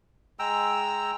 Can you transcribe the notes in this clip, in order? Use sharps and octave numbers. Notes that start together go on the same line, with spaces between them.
G#3 G5 A#5 E6